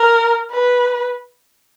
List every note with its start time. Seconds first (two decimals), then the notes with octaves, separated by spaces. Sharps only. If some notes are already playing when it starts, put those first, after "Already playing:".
Already playing: A#4
0.51 B4